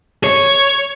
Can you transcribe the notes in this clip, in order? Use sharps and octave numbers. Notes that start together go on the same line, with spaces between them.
C#5